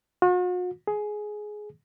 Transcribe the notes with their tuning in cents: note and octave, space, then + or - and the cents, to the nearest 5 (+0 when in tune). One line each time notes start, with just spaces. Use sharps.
F#4 -45
G#4 +15